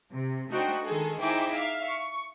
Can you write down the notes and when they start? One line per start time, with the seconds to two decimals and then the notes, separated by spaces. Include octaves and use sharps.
0.12 C3
0.51 A3 D4 D#4 F#4 C5 G5
0.84 D#3 G#3 G#4 A4
1.21 D#4 E4 G#4 C5 G5 D6
1.54 E5 F5
1.85 C#6